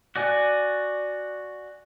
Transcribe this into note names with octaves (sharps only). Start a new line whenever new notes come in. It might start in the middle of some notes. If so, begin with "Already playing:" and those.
F#4 D5 G#5 F#6